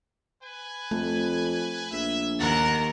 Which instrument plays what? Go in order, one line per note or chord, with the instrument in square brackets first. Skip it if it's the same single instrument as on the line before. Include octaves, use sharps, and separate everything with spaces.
[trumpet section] B4 G#5
[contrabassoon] F2 [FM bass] A3
[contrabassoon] A#1 [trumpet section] E5
[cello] D#2 A#4 [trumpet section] F#5